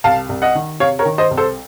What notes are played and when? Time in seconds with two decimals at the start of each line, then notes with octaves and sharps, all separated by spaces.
0.04 C2 F5 A5
0.29 C2
0.42 D#5 F#5
0.55 D#3
0.80 C3 C#5 F5
0.99 A#4 C#5
1.05 D#3
1.18 C5 D#5
1.31 C2
1.37 A4 C5